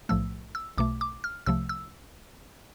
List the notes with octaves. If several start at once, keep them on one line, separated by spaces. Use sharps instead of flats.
B1 A2 F3 A3 E6
E6
B1 B2 A3 D6
D6
F6
C2 C3 F3 A3 E6
E6